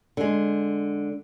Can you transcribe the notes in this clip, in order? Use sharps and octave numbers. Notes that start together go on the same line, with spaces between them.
D3 G#3